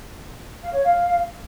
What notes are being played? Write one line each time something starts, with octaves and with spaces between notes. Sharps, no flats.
F5
C#5
F5